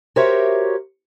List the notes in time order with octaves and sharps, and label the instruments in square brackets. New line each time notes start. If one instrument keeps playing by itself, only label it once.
[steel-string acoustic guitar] F#4 G4 A#4 C5 C#5 E5